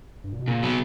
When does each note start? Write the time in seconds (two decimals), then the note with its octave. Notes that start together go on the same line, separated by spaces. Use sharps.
0.24 G2
0.32 A#2
0.39 B2
0.47 A#2 C#3
0.63 F#3 B3